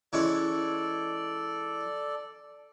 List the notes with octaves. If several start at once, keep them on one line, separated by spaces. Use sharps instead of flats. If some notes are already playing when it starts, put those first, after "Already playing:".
E3 G#3 C#4 A4 D5